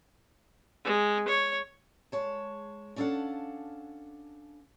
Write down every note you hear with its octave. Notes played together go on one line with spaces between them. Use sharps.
G#3
C#5
G#3 C#5 A5
C#4 D4 A4 C5 F5 F#5